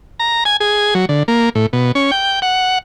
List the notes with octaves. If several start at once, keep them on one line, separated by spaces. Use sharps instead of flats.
A#5
G#5
G#4
F#3
D3
A#3
A2
B2
C#4
G5
F#5